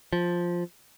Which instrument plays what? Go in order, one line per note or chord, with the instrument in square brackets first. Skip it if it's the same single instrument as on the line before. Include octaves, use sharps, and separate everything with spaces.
[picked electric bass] F3